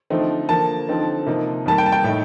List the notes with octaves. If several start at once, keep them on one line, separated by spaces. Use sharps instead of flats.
D3 F3 A3 C4 D#4
D3 F3 A#3 A5
D3 F3 C4 D#4
C3 F3 A#3 D#4
F2 D#3 G3 A#3 A5
G5
A5
G5
A2 A3 D#4